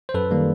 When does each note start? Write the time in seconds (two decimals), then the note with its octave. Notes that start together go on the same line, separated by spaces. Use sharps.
0.09 C5
0.14 F#2 A4 B4
0.31 D#3 G3 A#3